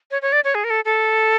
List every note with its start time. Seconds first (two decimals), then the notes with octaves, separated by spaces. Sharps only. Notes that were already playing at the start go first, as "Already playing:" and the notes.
0.11 C#5
0.22 C#5
0.32 D5
0.44 C#5
0.55 G#4
0.64 A#4
0.70 A4
0.85 A4